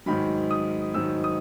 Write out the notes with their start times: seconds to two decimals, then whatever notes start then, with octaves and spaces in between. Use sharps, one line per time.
0.06 G#2 D#3 F#3 B5
0.51 D#6
0.94 G#2 D#3 F#3 E6
1.24 D#6